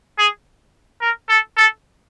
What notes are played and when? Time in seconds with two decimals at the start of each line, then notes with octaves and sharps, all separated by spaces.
0.18 G#4
1.01 A#4
1.29 A4
1.57 A4